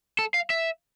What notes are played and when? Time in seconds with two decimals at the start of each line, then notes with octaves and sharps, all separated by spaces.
0.19 A4
0.34 F5
0.50 E5